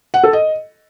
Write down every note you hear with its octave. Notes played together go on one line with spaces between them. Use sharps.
F#5
A4
D#5